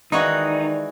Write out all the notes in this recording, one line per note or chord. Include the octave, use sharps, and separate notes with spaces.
D#3 E3 G#3 D#4 F#4 D5